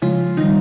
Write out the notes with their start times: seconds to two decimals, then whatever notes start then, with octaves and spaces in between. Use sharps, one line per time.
0.02 C#3 F3 G#3 F4
0.37 D#3 G3 D#4